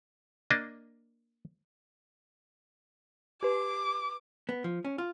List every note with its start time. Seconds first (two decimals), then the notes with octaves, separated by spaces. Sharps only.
0.50 A#3 D4 D#5
3.43 G4 B4 D6
4.49 B3
4.64 F3
4.85 C#4
4.98 F4